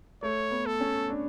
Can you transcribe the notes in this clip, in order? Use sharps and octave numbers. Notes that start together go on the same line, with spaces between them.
A3 C#5
B3
A4
C#4
D4